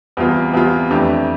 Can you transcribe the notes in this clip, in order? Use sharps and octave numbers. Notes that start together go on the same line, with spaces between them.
E2 C3 G3 B3 F4
E2 C3 G3 B3 F4
F2 E3 A3 D4 G4